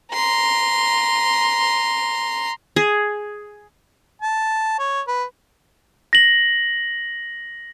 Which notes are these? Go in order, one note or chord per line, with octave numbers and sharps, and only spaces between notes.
A#5 C6
G#4
A5
C#5
B4
A#6 F#7